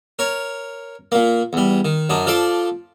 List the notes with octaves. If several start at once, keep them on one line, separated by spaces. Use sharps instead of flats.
A#4 C#5
A#2 A#3
E2 G3
D#3
F#2 D4 D#4
F3 A4 D5 C6 D6